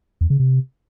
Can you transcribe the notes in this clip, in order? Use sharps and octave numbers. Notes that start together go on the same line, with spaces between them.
E2
C#3
C3